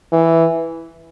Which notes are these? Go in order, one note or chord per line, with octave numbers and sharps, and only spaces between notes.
E3